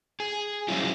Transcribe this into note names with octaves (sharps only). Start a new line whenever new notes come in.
G#4
F#3 G3 C#4 E4 F4